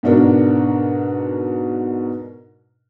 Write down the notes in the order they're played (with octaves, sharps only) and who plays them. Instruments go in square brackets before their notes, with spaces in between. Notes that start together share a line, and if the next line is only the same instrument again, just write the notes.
[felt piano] G#2 B2 D4 F#4 A#4